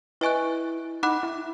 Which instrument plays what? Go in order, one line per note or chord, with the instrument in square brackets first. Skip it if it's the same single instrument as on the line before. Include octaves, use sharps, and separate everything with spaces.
[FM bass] E4 [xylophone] B4 D#5 G#5 C#6 F#6
[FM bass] D#4 [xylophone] F#5 B5 D6 F#6
[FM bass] E4